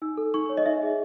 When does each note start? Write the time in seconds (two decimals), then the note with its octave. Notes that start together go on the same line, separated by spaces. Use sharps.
0.02 D#4 E6
0.17 A4
0.34 D#4 C#6
0.49 C#5
0.57 D#5
0.66 D#4 E5
0.83 G#4